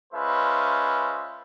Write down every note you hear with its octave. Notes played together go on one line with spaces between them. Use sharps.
G#3 C#4 F4 B4 C5 E5